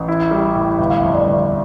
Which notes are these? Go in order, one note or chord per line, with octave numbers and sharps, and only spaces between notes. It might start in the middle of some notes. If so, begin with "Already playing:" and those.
Already playing: A1
E4
G3
A2
G1 E5
F5
F2 E5
D5
G1